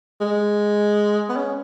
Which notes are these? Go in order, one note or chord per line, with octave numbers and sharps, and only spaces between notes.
G#3
B3
C#4